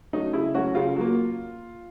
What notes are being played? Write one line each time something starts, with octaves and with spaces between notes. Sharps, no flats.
F#3 A3 C#4 D#4
C#3 E4
F#3 A3 C#4 F#4
C#3 F4
F#3 A#3